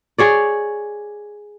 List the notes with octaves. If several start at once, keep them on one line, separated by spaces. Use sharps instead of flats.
G#4 C#5 D5